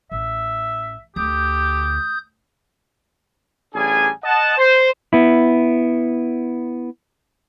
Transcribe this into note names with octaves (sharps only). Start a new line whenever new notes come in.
A1 E5
D2 G4 D#6 G6
A1 G3 D4 G#4 G#5
D#5 F#5 A5
C5
B3 E4